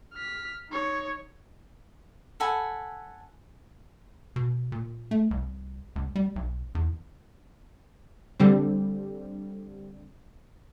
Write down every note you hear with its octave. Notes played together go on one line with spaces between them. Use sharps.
F6 B6
D#4 C#5
A4 F#5 G#5 B5
B2
A#2
A3
C2
C#2
G3
B1
E2
D3 G3 C4